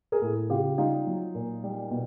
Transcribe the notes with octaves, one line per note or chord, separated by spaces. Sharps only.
G#4 A#4
A2
C#3 F4 G4
G3 D#4 F4
F#3
A#2
G3
B2